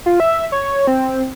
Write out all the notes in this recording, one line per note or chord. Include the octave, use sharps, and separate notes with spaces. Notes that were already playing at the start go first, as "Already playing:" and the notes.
F4
E5
C#5
C4